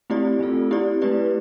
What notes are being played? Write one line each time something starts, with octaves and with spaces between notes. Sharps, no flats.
A3 C4 E4 G4 D5
A3 C4 F4 A4
C4 E4 G4 D5
A3 E4 G4 B4 D5